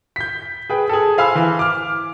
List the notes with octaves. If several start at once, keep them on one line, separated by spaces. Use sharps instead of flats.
G6 B6
G#4 B4 G5
G#4 A4
C5 F5 G#5 B5 E6
E3
D6 F6